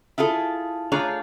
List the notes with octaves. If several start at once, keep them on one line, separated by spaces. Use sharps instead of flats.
E4 F4 G#4 A4
A3 D4 F4 G#4 C#5 A#5